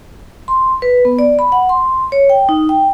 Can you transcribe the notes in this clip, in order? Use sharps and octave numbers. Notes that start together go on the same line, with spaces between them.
C6
B4
B3
D5
B5
F#5
C6
C#5
G5
D#4
G5